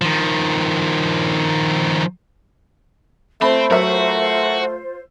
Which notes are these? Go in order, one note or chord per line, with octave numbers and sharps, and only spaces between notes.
D#3 F3
A3 C4 F4 C5 B5
F#3 F#4 A#4 E5